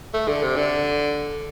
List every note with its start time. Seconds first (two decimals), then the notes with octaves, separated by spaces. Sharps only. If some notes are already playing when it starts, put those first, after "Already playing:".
0.14 A3
0.28 D3
0.43 C3
0.56 D3